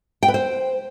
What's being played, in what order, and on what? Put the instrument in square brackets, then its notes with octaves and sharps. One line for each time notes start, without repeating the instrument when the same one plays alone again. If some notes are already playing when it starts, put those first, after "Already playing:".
[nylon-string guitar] G5
B4
C5